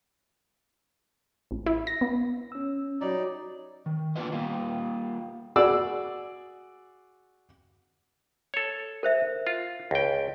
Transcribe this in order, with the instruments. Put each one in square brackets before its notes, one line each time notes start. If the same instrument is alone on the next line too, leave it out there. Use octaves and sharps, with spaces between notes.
[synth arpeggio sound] A1
E4
A#6
B3
[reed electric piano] C#4 E6
[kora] F#3 G3 [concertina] D#4 D5
[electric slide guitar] D#3
A#3 B3 D4 F4 B4 D#5
G3 A#3 D#4 F4
[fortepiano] F#4 G#4 D5 E6
[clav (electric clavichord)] A4 C#5
[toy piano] A#4 C5 E5
[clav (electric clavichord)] F4
C#2 G5